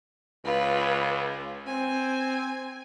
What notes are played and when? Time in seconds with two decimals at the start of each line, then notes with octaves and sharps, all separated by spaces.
0.45 C#2 F4 B4
1.67 C4 G#5